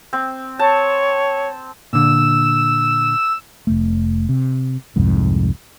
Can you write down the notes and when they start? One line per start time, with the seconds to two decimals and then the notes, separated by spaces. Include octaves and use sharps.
0.13 C4
0.59 C#5 A5
1.93 A#2 D3 E6
3.67 F1 A3
4.29 C3
4.96 C2 F2 G#2